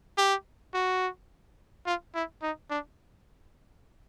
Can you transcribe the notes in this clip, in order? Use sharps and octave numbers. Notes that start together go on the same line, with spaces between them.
G4
F#4
F4
E4
D#4
D4